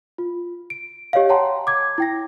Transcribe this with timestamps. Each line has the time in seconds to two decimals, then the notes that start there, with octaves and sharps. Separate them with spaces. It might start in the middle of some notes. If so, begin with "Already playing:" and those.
0.18 F4
0.70 D7
1.13 G4 C#5 D#5 F5
1.29 C#5 F#5 G5 A5 A#5 C6
1.67 D6 G#6
1.98 E4 G5 A#6